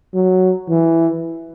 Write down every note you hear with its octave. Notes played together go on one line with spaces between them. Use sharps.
F#3
E3